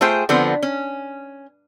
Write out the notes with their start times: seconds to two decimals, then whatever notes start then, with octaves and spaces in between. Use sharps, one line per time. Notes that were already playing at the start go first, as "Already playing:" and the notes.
0.01 A3 F4 G#4 C5 G5
0.29 D3 F3 B3 C4
0.63 C#4